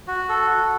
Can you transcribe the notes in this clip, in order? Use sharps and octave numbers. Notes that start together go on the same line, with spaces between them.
F#4
A4
F#4